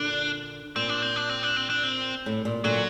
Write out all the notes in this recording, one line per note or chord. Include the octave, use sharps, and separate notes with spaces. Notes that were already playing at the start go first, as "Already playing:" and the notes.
Already playing: A#2 D3 D4
A#2 C4
D4
C4
D4
C4
D4
C4
D4
C4
A2
A#2
A#2 D3 F#3